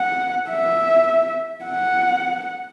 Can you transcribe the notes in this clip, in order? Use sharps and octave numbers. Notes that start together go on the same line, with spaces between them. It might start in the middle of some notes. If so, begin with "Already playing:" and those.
Already playing: F#5
E5
F#5